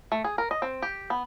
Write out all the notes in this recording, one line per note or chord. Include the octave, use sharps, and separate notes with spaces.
A3
G#4
A#4
D#5
C4
G4
B3